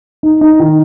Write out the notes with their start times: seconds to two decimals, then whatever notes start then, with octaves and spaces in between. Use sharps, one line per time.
0.23 D#4
0.41 D#4
0.60 D#3